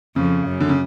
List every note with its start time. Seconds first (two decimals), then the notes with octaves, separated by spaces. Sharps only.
0.16 F2 C#3
0.47 F#2
0.60 D3
0.69 C#3